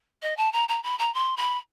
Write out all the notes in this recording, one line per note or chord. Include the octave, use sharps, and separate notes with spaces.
D#5
A5
A#5
A#5
B5
A#5
C6
B5